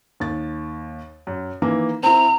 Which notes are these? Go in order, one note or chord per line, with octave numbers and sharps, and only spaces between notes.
D#2 A6
F#2
D#3 E3 A#3
C4 E4 A#5